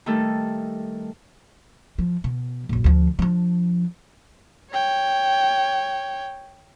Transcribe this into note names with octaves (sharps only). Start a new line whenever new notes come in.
D#3 G3 A3 A4
F3
B2
A#1 F#2
D2 F3
F3 D4
C#5 G5